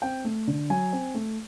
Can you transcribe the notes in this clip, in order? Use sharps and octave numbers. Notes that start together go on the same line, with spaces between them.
C4 G5
A3
D3
F#3 G#5
C4
A3